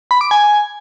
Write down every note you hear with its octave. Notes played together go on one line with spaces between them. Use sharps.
B5
D6
G#5